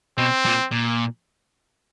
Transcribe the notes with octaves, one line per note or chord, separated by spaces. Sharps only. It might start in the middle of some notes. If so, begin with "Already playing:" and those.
B2 C4
A#2
A#2